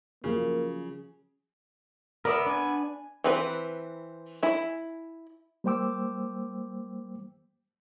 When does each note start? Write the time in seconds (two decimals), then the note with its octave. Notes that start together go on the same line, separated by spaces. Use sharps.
0.24 C#3 F3 F#3 A#3 C#4
2.25 B3 A#4 D5 E5
2.46 D4 G#5
3.24 E3 C4 B4
4.43 E4 G#5
5.64 G3 A#3 C5 G5 D6 E6